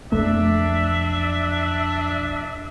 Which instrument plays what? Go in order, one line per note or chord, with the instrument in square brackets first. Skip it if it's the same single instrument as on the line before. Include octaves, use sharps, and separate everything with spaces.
[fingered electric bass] B1 F2 [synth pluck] A3 [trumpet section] D4 [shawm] E5